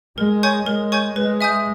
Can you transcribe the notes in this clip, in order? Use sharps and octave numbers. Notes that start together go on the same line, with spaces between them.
G#3 A#4
C#5 G#5 C#6 G6
G#3 A#4
C#5 G#5 C#6 G6
G#3 B4
E5 G#5 D#6 G6